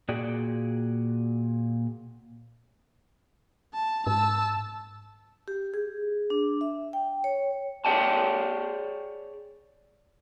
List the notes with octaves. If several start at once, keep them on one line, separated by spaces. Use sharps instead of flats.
A#2 F#4 G#4 D5 G5
A5
G#2 A5 E6
G4
G#4
D4
E5
G5
C#5
G#4 C#5 D5 G5 A5